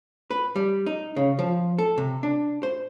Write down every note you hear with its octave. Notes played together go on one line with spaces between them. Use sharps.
B4
G3
D#4
C#3
F3
A4
C3
D4
C5